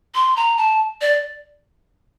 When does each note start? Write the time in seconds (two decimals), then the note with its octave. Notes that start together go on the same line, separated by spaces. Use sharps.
0.15 C6
0.37 A#5
0.58 A5
1.01 D5